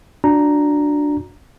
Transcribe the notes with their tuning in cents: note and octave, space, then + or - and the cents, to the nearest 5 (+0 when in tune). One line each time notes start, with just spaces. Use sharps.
D4 +0 F#4 -30 A#5 +0